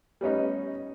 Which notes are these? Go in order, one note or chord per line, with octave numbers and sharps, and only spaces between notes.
G3 B3 C#4 D#4